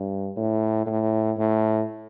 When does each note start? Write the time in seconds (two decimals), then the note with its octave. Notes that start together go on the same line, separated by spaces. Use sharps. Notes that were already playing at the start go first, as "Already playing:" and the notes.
Already playing: G2
0.36 A2
0.86 A2
1.38 A2